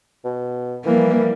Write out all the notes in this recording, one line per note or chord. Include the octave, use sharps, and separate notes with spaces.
B2
E3 F3 G3 A#3